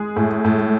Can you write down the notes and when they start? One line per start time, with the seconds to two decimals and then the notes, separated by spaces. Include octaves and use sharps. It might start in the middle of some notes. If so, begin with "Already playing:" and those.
Already playing: G#3 G#4
0.16 A2
0.45 A2